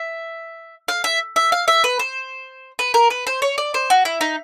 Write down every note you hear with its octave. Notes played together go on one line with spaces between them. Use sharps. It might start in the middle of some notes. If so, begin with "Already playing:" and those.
Already playing: E5
F5
E5
E5
F5
E5
B4
C5
B4
A#4
B4
C5
C#5
D5
C5
F#4
E4
D#4